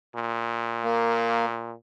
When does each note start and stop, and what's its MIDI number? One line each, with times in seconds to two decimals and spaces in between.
0.16 1.74 46
0.83 1.46 58